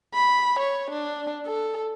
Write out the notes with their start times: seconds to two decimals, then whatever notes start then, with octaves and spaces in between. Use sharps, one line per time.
0.14 B5
0.59 C#5
0.91 D4
1.46 A4